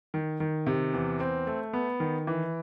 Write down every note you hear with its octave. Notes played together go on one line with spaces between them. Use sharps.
D#3
D#3
C3
E2
C4
A3
B3
D#3
E3